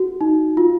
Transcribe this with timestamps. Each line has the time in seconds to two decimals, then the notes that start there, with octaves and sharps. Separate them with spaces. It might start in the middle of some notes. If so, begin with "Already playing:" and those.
Already playing: F#4
0.21 D#4
0.57 F4